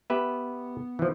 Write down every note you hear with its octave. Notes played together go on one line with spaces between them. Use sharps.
B3 G4 B4 E5
E3 F3